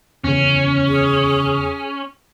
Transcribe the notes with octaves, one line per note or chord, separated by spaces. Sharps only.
E2 C#3 C#4
G#4